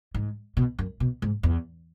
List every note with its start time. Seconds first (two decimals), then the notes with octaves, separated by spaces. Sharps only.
0.14 G#2
0.57 B2
0.79 F#2
1.00 B2
1.22 G#2
1.43 E2